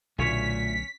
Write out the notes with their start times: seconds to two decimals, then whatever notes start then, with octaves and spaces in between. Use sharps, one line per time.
0.18 B1 A#2 D3 A3 C#4 C#5 B6